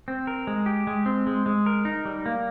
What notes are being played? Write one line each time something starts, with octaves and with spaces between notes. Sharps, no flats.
C4
A#4
G#3
G4
G#3
C4
G#3
G#3
A#4
D#4
G3
A#3